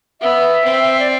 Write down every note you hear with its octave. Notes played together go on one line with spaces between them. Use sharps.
B3 E5
C4
D5